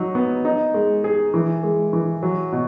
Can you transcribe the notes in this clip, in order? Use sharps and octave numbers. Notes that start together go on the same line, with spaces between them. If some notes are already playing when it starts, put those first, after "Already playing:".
Already playing: F#3 D#4
B3
D#4
G#3
G#4
E3
G#3
E3
F#3
B2